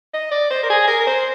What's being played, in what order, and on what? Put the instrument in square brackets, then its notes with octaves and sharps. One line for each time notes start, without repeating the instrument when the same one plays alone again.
[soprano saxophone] D#5
D5
C5
A#4
G#4
A#4
A#4
C5